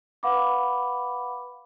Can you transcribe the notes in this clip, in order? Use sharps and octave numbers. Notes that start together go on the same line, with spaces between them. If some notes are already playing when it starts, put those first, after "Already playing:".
B4 F5 F#5 B5 D6